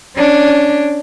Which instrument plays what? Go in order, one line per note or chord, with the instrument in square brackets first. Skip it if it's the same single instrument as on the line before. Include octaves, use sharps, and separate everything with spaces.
[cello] C#4 D4